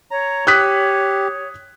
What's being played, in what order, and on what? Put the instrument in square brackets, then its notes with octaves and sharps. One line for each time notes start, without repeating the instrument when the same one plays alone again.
[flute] C#5 [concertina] A#5
[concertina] G4 [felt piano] D#6 F#6 B6